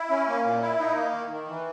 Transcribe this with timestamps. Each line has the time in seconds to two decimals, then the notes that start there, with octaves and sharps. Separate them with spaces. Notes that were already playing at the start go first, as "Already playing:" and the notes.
Already playing: E4
0.10 C#4
0.28 A#3
0.45 A#2
0.61 E4
0.79 D#4
0.95 A#3
1.13 D#3
1.30 D#3
1.47 E3